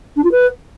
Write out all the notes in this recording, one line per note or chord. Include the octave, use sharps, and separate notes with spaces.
D4
F4
B4